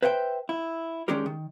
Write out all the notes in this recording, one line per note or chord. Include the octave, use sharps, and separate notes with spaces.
B4 C5 E5 F#5 G5
E4
D#3 G#3 C#4 D4 G4 A#4
D#3